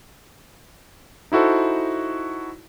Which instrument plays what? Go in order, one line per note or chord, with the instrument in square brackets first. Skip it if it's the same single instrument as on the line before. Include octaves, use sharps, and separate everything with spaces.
[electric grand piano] D#4 E4 F#4 A4 C5